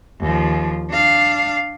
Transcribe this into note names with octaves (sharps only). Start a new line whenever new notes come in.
D#2 F3
D4 F5